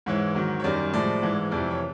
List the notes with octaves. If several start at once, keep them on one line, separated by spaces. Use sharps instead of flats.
G#2 E3 G#3 C#5
G#2 D#3 F#3
C#5
F#2 D#3 G3 D5
A2 F3 G#3 D5
G#2 E3 G#3
F2 C3 E3 D5
C#5